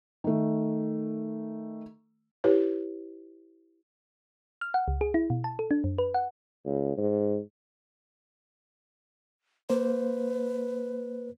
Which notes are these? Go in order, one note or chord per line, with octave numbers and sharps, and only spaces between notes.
D#3 A3
E4 G4 B4 C#5
F6
F#5
C#2
G#4
E4
B2
A5
A4
D4
F#2
B4
F#5
C#2
G#2
A#3 B4 C5